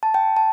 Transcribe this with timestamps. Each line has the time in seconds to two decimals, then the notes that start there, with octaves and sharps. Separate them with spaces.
0.03 A5
0.14 G5
0.37 A5